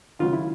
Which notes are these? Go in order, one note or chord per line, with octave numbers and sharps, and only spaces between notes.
D#2 C#3 F#3 F4
E4